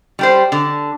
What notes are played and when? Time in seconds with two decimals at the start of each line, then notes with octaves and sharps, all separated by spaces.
0.19 G3 G4 C5
0.52 D3